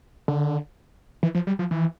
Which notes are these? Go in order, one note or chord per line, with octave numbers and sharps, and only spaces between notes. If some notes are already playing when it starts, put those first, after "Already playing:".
D3
E3
F3
G3
F3
E3